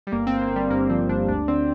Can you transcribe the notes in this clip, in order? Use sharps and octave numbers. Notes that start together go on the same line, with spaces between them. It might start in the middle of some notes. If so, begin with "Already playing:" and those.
G3
G1 A#3
G1 C4
A#3
G1 G3
G2 A#3
F3 C4
G1 D4
D2 D4
D3 C4